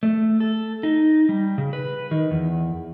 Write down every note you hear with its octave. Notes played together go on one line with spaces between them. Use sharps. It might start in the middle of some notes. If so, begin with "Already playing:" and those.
A3
A4
D#4
G3
C#3
B4
D#3
E2